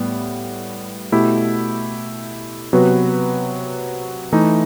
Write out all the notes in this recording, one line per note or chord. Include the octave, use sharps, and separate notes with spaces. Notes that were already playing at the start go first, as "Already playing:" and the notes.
Already playing: A2 G3 B3
B2 A3 E4 G4
C3 F#3 B3 F#4 B4
E3 A3 D#4